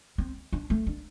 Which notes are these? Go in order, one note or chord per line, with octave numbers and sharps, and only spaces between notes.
C4
D4
A3
D4